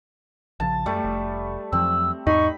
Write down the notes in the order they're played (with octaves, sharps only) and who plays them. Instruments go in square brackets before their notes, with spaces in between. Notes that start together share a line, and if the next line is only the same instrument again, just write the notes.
[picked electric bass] A#1 C#3 F3 [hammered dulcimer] A5
[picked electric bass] F#2 [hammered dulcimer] G3 A3
[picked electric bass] F1
[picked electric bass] F2 F3 F#3 [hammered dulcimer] C4 [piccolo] E6
[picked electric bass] E2 G#2 [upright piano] D#4 [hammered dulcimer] B5 [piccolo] C#6